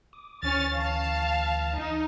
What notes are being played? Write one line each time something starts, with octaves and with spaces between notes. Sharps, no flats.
D6 D#6
D2 E3 C#4 F6 A6 A#6
F5 A5
D#4